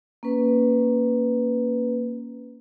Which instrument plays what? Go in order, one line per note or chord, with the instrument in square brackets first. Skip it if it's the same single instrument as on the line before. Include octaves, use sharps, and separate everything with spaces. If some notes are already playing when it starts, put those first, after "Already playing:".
[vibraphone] A#3 C#4 B4